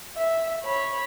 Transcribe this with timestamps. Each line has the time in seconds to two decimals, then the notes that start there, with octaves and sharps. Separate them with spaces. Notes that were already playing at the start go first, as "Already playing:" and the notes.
0.17 E5
0.63 C#5 B5